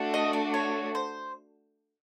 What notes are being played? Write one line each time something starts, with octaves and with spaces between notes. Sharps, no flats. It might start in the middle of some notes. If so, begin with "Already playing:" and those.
Already playing: A3 D4 F#4
D#5
D5
C#5
C5